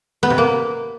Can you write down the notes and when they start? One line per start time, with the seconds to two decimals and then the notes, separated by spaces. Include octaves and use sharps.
0.23 B3
0.30 C3
0.38 A#3